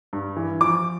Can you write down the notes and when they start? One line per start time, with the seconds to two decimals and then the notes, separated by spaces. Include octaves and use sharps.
0.13 G2
0.36 E3
0.61 F3 D6